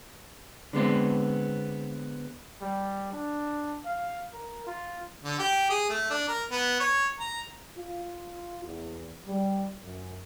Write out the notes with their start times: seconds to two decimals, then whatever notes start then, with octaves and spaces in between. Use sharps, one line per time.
0.73 D3 G#3 B3 C4
2.61 G3
3.13 D4
3.85 F5
4.33 A#4
4.67 F4
5.24 D3
5.39 G4
5.70 G#4
5.90 A3
6.10 D4
6.28 A#4
6.51 B3
6.80 C#5
7.19 A#5
7.77 F4
8.64 E2
9.27 G3
9.82 F#2